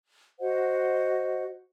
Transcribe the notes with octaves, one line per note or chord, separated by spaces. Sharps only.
F#4 C5 D#5 F#5